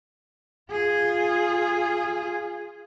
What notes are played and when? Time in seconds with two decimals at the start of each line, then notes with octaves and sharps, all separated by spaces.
0.71 F4 G#4